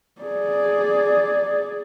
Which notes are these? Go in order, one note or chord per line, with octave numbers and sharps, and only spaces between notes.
G#4 D5